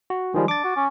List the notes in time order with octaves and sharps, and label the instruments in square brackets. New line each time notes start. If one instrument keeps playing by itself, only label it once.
[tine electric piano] F#4
[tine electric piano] D#3 F3 G3 [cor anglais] G#3
[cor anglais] D4 [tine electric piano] D6 A6
[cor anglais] F#4
C#4